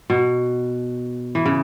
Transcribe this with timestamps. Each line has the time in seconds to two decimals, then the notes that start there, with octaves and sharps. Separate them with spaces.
0.10 B2
1.35 E3
1.46 C#3